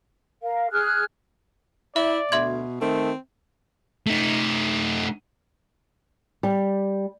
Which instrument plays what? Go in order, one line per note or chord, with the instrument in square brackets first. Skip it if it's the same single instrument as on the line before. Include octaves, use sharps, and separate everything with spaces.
[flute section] A#4 F5
G#4 F6 F#6
[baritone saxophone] E4 [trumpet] D5 [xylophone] E5
[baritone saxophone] D2 [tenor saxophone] B2 [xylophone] E5 C6 G#6
[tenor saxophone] D#3 [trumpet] A3 [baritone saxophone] C4
[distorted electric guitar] A3 D#4
[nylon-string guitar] G3